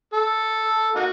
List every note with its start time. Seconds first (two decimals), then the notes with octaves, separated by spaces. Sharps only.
0.13 A4
0.95 A#3 D#4 F#4